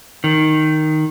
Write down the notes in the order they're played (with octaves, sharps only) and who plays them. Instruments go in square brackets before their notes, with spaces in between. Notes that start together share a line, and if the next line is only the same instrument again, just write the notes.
[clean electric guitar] D#3